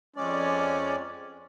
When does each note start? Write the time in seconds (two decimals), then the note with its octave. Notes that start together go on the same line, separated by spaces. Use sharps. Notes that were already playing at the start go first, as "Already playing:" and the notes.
0.16 F2 G#3 C#4 D5